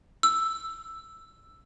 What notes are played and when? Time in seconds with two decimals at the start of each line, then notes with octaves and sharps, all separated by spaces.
0.23 E6